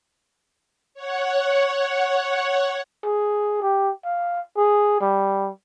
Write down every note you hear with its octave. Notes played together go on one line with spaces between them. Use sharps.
C#5 F#5
G#4
G4
F5
G#4
G3